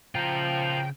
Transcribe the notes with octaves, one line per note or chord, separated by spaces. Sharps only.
C#3 F3 F4 A#4 G5 A#5